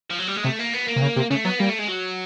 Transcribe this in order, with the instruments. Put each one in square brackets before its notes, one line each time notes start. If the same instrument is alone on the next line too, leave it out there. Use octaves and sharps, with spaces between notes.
[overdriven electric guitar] F3
F#3
G3
G#3
[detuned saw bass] C3 [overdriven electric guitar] A3
[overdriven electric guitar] A#3
B3
A#3
[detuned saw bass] C3
C#3
C3
[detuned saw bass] C#3 [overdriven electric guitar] A3
[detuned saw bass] F#3 [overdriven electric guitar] B3
[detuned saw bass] G3 [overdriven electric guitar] A#3
[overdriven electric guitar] A3
G#3
F#3